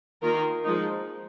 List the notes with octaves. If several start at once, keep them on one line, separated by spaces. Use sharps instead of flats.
D#3 A#3 F4 A#4
F3 G#3 D#4